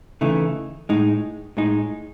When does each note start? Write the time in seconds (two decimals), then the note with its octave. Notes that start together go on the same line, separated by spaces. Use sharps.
0.21 C#3 E3 A3 D#4
0.89 A2 G#3 D#4
1.57 A2 G#3 D#4